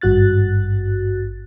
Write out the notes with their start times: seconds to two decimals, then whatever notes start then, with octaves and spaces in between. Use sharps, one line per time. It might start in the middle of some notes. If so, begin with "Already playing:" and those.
0.01 G#1 G2 F#4 F#6 A6